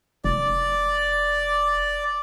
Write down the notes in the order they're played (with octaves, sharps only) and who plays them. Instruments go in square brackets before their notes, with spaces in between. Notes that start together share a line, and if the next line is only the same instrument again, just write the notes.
[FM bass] F1 [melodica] D5